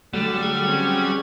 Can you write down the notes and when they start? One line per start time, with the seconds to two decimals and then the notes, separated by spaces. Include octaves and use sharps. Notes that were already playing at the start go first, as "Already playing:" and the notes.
0.14 D3 F#3 G3 A3 A4 F#5
0.43 G#4
0.67 C4 C#4